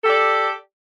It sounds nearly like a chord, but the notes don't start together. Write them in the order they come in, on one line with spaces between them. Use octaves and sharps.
A4 G4 D5